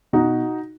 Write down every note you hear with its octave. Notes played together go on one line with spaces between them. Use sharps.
B2 D#4 F#4